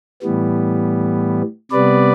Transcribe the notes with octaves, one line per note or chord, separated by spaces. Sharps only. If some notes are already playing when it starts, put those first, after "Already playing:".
A2 E3 G3 B3
C3 G3 B3 B4 D5